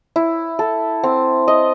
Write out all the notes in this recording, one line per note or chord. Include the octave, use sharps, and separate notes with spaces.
E4
A4
C4
D#5